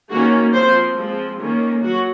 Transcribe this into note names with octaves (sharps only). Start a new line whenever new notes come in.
D#3 A#3 C#4 F#4
F3 C4 C5
F3 G#3 C4
D#3 A#3 C#4
F#3 F#4